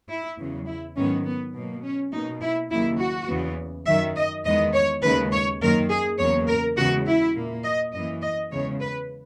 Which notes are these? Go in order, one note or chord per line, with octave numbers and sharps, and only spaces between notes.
E4
E2 C#3 F#3
E4
G#2 D#3 F#3 B3 C#4
B3
B2 F#3 A#3
C#4
B2 A#3 D#4
E4
D#2 C#3 F#3 A#3 E4
F#4
E2 C#3 E3 B3
F#2 D#3 F#3 E5
D#5
E2 D#3 G#3 B3 D#5
C#5
D#2 C#3 G#3 B4
C#5
F#2 D#3 A#3 A#4
G#4
E2 C#3 F#3 A#3 C#5
A#4
E2 C#3 G#3 F#4
E4
A#2 A#3
D#5
F#2 E3 A#3 D#5
D#5
E2 C#3 G#3 C#5
B4